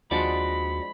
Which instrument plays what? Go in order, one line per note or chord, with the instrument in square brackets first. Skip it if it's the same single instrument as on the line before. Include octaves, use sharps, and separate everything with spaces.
[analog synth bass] D#2 [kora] F3 G#3 [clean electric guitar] D4 F#4 D5 [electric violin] B5